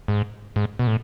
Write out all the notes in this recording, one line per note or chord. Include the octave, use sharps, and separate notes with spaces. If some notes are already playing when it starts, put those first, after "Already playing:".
G#2
G#2
B2
A2